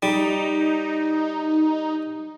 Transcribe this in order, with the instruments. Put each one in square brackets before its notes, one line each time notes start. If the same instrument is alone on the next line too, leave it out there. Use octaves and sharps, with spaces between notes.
[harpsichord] G3 [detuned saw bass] D#4